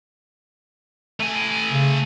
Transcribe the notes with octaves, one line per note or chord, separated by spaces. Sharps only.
A3 G#5
C#3